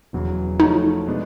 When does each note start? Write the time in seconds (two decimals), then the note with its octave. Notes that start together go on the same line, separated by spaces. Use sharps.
0.13 E1 E2 C#3 F#3
0.60 C#3 F3 A3 C#4 D#4 F#4
1.07 B2 G#3 B3 D4